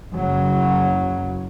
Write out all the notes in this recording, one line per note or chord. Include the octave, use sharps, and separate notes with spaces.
F#1 F#2 C#3 F#3